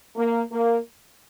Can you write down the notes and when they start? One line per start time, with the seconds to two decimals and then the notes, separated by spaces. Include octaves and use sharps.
0.16 A#3
0.52 A#3